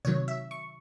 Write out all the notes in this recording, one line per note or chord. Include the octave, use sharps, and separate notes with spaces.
C3 D#3 F#3 C#5
E5
C#6